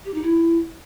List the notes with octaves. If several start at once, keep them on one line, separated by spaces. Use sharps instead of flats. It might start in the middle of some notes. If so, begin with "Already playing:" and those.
G4
D#4
E4